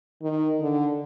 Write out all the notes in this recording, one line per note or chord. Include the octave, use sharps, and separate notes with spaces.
D#3
D3